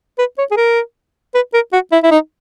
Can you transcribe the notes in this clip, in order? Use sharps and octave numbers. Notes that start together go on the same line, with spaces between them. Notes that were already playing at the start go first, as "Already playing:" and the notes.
B4
C#5
G#4
A#4
B4
A#4
F#4
E4
E4
D#4